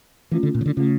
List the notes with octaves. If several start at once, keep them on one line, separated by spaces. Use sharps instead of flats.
E3 A3 C#4 F4
D3
A#2
C#3
D3
C#3 A3 C#4 F4